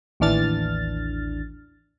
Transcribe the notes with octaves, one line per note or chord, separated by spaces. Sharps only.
A1 D#2 E3 D4 F6 A6